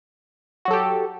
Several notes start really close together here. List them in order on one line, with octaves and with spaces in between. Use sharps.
F#4 F#3 A4 G4